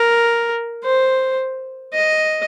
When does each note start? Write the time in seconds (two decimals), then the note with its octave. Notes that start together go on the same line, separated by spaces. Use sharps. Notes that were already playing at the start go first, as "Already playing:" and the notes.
Already playing: A#4
0.84 C5
1.93 D#5